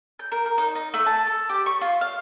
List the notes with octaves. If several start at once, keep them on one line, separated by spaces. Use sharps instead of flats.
G6
A#4
A#4
D#4
D#4
A3
A5
A4
G4
C#6
F4
F5